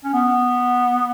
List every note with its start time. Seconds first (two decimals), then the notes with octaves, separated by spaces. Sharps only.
0.04 C#4
0.14 B3